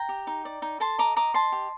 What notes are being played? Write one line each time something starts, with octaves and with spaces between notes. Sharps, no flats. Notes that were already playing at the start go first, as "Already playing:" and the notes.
Already playing: G5 A#5
G4
D#4
D5
D#4
A4 A5 C6
D#5 A#5 D6
D#5 A#5 D6
D#5 A5 C6
G4